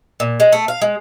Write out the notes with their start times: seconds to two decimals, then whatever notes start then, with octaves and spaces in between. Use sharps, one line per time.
0.20 A#2
0.40 G#3
0.52 A3
0.68 F5
0.81 G#3